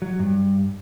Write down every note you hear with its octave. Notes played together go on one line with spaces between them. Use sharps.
F#3
G2